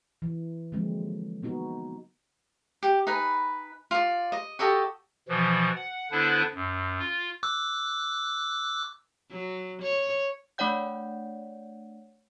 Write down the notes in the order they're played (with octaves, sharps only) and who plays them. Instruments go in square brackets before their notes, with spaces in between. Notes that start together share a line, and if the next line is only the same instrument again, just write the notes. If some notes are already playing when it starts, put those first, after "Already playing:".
[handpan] E3
D3 F3 F#3 G#3 A#3 C4
A#3 B3 D#4 F#4
[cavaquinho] G4
D#4 B4 G#5
F4 D5
D#5
F#4 G4 A4 D#5
[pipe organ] B2 E3 F3
F#5
D3 B3 D4 E4 B4 C5
F#2
F4
[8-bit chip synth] D6 E6 F#6
[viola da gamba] F#3
C#5
[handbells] A3 D4 C#5 D5 F#5 G6